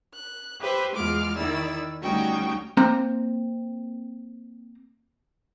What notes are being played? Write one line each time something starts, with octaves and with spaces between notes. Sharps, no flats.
F#6
G4 B4 C5 E5
E2 G#3 F4 D6 F6
D#3 E4 D5 E6
D2 G3 C#4 D#4 F#4 G5
A#3 C4 A#5